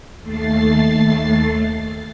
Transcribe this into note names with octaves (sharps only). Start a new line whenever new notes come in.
D#2 A3 A6 C7